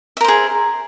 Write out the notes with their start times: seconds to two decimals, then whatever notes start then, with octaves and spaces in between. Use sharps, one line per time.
0.17 E5
0.21 A#4
0.24 C5
0.28 G#4